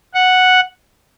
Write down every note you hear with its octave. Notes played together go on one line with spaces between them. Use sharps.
F#5